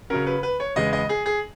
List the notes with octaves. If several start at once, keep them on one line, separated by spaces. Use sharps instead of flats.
C#3 F#3 C#4 A#4
B4
B4
C#5
E2 C#3 G#3 B3 D#5
D#5
G#4
G#4